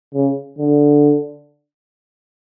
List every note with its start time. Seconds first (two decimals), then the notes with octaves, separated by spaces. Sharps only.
0.14 C#3
0.58 D3